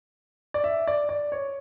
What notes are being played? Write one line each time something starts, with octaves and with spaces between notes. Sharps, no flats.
D5
E5
D5
D5
C#5